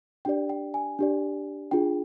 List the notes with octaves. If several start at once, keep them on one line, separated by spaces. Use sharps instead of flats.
D4 G4 D5 G5
G5
G#5
D4 G4 D5
D4 F4 G#4 G5